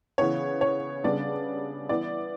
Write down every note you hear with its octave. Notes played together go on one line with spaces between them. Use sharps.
C#3 E3 B3 C#5
C#5
C#3 G3 B3 D4 D5
E3 B3 E4 D5